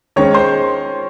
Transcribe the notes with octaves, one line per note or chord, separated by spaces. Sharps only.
D#3 G#3 C#4 C#5 C#6
C5 C6